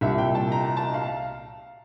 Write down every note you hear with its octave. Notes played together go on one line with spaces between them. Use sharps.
C2 A#2 G3 E5
G5
A5
A#5
A5
F5